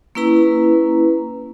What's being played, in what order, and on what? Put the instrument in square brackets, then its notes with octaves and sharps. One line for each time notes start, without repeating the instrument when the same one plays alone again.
[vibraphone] A#3 C#4 E4 B4 A#5